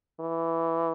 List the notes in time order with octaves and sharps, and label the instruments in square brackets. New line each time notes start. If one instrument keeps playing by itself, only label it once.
[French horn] E3